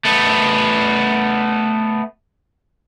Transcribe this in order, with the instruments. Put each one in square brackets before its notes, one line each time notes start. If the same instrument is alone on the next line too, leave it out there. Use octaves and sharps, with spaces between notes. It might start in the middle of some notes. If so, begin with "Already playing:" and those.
[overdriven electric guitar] A3 B3